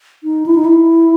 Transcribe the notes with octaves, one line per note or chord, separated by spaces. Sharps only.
D#4
E4
D#4
E4